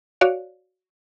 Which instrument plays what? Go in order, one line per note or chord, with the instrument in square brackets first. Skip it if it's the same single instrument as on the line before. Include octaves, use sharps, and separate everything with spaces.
[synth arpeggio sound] F#4 C#5 D5 F5